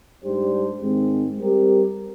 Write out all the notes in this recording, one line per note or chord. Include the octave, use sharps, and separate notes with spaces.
G#2 G3 D4 G4 C5
G#2 D#3 G#3 C4
G3 C4 G4 A#4